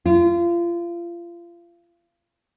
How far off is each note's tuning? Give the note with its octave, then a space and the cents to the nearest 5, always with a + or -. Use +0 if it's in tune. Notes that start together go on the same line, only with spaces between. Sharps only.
F4 -30